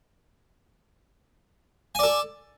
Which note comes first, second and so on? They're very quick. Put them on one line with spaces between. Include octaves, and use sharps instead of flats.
G#5 D5 A4